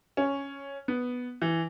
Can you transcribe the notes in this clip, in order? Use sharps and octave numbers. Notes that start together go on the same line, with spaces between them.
C#4
B3
E3